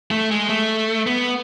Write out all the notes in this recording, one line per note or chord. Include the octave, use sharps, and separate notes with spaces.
A3
G#3
A3
B3